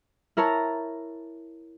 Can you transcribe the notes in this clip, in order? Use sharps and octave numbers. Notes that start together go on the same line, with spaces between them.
E4 A#4 C#5 A5 A#5